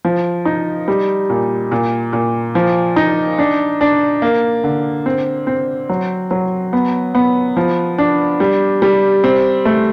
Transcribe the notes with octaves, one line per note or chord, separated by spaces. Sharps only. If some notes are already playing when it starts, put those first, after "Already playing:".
F3
D#4
G3
A#2
A#2
A#2
F3
D#4
D4
D4
A#3
D3
C4
C4
F#3
F#3
B3
B3
F3
D4
G3
G3
C4
A3